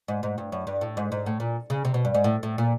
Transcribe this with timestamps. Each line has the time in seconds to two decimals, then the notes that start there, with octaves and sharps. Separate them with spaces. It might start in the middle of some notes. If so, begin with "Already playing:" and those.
0.08 G#2
0.23 G#2
0.38 G2
0.52 F#2
0.67 G2
0.81 A2
0.97 G#2
1.12 G#2
1.26 A2
1.40 A#2
1.70 C#3
1.85 C3
1.94 B2
2.05 G2
2.15 G#2
2.24 A2
2.43 A2
2.58 A#2